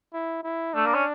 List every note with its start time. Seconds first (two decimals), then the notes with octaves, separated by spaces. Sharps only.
0.14 E4
0.44 E4
0.74 A3 D4
0.85 A#3
0.94 C#4